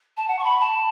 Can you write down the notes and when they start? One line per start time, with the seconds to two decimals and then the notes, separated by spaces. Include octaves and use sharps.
0.17 A5
0.28 F#5
0.39 C#6
0.44 B5
0.60 A5